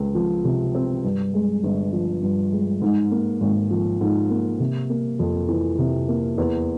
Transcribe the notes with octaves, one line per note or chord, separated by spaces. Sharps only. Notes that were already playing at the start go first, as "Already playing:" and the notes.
Already playing: C#2 C4
F3
C3
C4
G2
G#3
G1
F3
G2
G#3
G#2
A#3
G#1
F3
G#2
A#3
C3
A#3
F2
E3
C3
A#3
E2